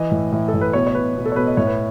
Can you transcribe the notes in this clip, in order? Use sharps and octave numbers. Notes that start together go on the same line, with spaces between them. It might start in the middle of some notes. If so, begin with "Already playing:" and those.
Already playing: E3 D#5
A2
A2
A4
A2
B4
B2 C#5
C#5
B2 B4
B2
A4
C#5
B2 B4
D#5
A2 C#5
B4